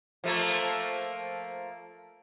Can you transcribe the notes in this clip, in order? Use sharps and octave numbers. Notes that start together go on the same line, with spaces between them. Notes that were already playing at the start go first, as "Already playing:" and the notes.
F3 A3 A#3